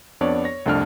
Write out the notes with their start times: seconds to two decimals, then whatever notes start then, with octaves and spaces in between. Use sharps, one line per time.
0.21 F2 B3 D4 C#5 D5 C#6
0.44 C#5 A#6
0.66 C2 F2 A3 D4 A5 F6